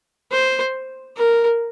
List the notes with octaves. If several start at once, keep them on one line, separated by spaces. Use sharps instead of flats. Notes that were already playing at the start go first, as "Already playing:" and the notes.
C5
A#4